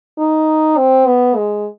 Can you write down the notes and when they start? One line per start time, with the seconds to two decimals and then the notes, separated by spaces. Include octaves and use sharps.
0.19 D#4
0.78 C4
1.07 B3
1.36 G#3